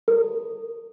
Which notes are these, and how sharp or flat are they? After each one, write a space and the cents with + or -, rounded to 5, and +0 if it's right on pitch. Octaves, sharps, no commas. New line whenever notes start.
A#4 -30